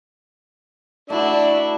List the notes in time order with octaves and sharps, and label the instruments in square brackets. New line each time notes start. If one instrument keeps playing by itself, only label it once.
[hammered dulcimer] A3 F#4 [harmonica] D4 [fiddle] E4